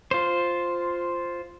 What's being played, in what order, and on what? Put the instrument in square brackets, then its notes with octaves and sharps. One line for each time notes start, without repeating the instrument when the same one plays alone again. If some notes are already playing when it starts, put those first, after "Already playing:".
[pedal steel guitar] F4 C5